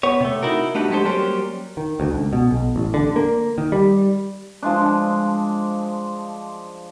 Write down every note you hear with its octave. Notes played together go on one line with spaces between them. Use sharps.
B3 C#5
C3 A3
D#4 E4 F#4 A#4
A3 B3 D4 D#4 F#4 G4
F#3 G#3 G4 A4 C5
F#3 G3 A#3 C#4 G4 C5
D#3
D2
C#2
B2
B1
A1
D3
A#3
D#3
G3
F3 G#3 D4